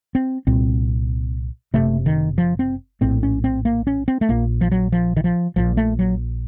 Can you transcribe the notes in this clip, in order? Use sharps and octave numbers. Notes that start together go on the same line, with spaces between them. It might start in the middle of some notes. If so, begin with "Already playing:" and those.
C4
C2 A#2 C4
F#1 F2 C3 A3
D#3
F3
C4
A#1 A2 C4
C#4
C4
A#3
C#4
C4
A3
A#1 A#2 A#3
F3
F#3
F3
D#3
F3
A#1 A#2 F3
A3
F#3